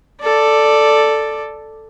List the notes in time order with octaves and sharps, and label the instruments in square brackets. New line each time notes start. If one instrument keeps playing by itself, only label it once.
[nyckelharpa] A4 D5